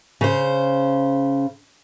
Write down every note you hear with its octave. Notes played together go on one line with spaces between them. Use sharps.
C#3 C5